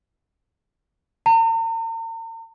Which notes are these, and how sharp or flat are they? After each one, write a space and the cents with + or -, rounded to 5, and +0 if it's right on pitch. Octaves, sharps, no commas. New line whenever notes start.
A#5 -45